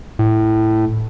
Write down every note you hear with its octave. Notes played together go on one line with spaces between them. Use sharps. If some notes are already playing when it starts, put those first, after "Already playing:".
A2